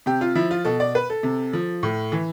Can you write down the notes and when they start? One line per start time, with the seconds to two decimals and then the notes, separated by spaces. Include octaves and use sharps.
0.06 C3 G4
0.21 F4
0.35 F3 E4
0.51 F4
0.65 B2 A4
0.80 D5
0.95 B4
1.10 A4
1.23 C3
1.53 F3
1.83 A2
2.12 E3